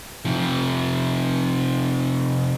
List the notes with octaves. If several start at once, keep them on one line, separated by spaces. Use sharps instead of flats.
C3 F3